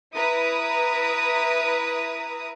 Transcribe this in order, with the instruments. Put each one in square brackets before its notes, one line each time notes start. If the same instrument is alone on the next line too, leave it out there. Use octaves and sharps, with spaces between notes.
[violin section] E4 B4 A#5 D#6